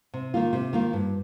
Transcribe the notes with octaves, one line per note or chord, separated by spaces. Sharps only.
C3
D#3 A#3 F4
C3
D#3 A#3 F4
G2